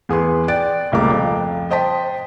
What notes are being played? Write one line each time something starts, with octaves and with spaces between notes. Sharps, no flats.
E2 G#4 B4 C6
D5 G5 F#6 A6 D7
F1 C#2 G3 A#3 D6
F2
C5 D#5 G5 A5 C6 B6